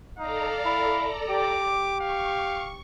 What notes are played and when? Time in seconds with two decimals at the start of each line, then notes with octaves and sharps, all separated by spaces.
0.19 D#4 A4 D5 F5 A#5
0.65 E4
1.29 G4 D6
2.00 F5 C#6